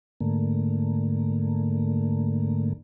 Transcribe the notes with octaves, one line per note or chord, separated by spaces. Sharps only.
G#2 D3 A3 A#3